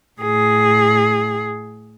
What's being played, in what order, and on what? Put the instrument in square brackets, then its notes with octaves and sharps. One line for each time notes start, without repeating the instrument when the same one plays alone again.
[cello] A2 G#4